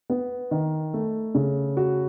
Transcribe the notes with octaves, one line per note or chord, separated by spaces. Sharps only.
B3
D#3
A3
C#3
F#4